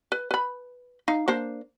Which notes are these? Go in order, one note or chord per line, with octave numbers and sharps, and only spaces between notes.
B4
B4 B5
D#4 F5
A#3 D4 C5